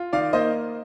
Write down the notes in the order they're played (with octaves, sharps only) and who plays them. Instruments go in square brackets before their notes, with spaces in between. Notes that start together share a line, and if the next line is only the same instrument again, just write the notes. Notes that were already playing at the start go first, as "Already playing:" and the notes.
Already playing: [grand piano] F4
D#3 D5 F5
A#3 C5 D#5